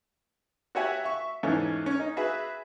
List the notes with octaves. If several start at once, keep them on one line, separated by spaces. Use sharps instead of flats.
F#4 G4 C#5 E5 F#5 G#5
E5 C#6
E2 G#2 A3 C#4
C#4
D#4
F#4 G#4 B4 E5